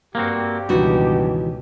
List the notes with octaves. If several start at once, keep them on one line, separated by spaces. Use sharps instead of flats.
G2 A#3 C4 F#4 G4
C#2 G2 B2 D#3 E3 F#4